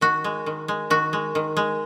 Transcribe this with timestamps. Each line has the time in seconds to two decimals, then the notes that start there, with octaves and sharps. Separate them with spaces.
0.01 D#3 F#4
0.24 G#3
0.46 D#3
0.68 G#3
0.90 D#3 F#4
1.13 G#3
1.35 D#3
1.57 G#3